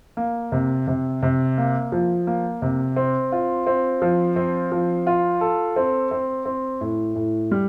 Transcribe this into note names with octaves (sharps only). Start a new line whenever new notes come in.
A#3
C3
C3
C3
A#3
F3
A#3
C3
C4
F4
C4
F3
C4
F3
F4
A4
C4
C4
C4
A2
A2
G3